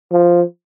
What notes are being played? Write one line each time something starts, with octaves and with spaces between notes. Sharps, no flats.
F3